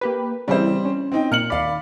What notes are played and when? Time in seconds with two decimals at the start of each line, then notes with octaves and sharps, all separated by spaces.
0.01 A#3 G4 B4
0.48 C#3 E3 G3 C4 E4 C5
0.85 C#4
1.12 C4 D#4 G5
1.32 A#2 F6 C#7 F#7
1.50 D#2 D5 F5 B5